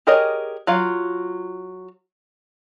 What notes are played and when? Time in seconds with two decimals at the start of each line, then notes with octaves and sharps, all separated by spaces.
0.07 G4 G#4 A#4 C#5 D#5
0.67 F#3 F4 F5